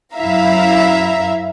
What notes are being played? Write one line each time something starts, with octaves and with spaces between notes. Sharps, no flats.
F#2 E4 E5 F5 A#5